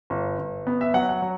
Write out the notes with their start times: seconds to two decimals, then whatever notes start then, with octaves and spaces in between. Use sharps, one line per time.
0.10 G1
0.38 G1
0.67 B3
0.81 E5
0.94 F#3 F#5
1.09 F#5
1.22 F#3